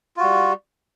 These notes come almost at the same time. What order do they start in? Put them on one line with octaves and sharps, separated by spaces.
F4 F#4 G3